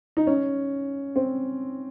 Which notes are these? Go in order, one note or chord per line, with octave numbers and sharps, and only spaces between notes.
D#4
C#4
C4